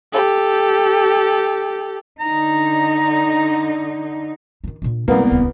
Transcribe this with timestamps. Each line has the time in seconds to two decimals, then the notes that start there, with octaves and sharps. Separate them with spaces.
0.13 G4 A4
2.20 D3 D#4 A#5
4.64 D#3 D#4
4.82 A#2 D4
5.08 C2 F#2 G#3 A#3 B3
5.31 D#1 C#2